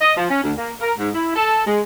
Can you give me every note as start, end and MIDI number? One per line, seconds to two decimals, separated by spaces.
0.01 0.15 75
0.17 0.25 53
0.30 0.41 61
0.44 0.53 38
0.58 0.72 58
0.81 0.92 70
0.99 1.10 44
1.15 1.34 64
1.36 1.66 69
1.67 1.81 56